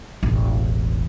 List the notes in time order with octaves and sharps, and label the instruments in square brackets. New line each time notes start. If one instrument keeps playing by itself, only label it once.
[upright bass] E1 A1